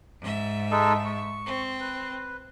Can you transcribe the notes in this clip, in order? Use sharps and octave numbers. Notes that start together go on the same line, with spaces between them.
G#2 E5
G#3 D#4 A4
C#6
C4
B4